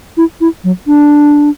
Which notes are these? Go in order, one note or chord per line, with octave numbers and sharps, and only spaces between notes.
E4
E4
F#3
D4